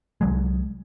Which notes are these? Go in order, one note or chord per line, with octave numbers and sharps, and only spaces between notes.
C2 F#3 G#3